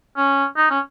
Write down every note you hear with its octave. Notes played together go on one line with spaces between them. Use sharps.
C#4
D#4
C#4